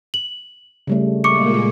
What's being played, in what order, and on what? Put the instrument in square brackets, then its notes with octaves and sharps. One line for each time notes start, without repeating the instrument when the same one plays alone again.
[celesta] F#7
[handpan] C#3 G3 A3
[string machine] A#2 G#3 A#3 [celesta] C#6 D6 C#7